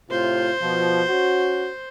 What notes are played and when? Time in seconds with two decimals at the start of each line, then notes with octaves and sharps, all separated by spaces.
0.11 A2 C3 F4 C5
0.62 B2 F3
1.10 C#4 F#4